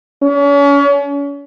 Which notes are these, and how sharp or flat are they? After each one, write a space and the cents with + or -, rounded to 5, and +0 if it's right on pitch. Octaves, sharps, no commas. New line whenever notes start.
C#4 +40